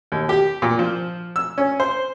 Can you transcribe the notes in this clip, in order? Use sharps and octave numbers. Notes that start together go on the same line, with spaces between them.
D#2
G4
A#2
F3
E6
C#4
C5